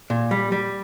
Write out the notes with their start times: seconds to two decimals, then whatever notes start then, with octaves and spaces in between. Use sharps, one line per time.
0.10 A#2
0.31 G3
0.52 G3